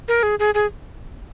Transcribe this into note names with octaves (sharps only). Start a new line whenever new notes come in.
A#4
G#4
G#4
G#4